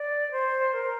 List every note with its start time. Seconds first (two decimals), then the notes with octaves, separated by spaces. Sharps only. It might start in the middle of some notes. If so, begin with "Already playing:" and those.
Already playing: D5
0.31 C5
0.74 A#4